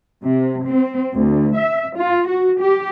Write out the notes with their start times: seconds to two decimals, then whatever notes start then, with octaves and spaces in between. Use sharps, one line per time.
0.25 C3
0.67 C4
1.15 D2
1.57 E5
1.98 F4
2.28 F#4
2.60 G4